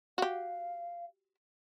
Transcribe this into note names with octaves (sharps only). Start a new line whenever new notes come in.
F#4 G4 F5